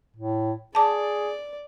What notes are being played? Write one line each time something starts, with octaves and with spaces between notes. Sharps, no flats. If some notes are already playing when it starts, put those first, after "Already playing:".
A2
G#4 D5 A5 D6